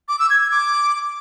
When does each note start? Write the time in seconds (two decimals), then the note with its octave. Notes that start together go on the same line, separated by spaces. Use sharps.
0.09 D6
0.19 E6
0.30 G#6
0.41 G#6
0.51 D6